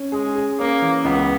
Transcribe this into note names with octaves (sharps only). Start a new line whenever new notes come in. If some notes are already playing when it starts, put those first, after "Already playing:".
Already playing: C#4
G#3 G#4
G#4
A#3 C#4
E3
C#2 B3